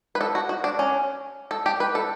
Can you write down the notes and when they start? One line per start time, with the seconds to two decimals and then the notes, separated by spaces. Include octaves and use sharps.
0.15 B4
0.21 A4
0.35 F#4
0.49 F#4
0.64 D4
0.79 C#4
1.51 A4
1.66 G4
1.80 B4
1.95 A4